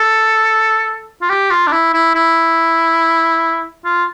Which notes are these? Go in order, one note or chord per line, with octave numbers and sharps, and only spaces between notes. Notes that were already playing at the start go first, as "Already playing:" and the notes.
Already playing: A4
F4
G4
F4
D4
E4
E4
E4
F4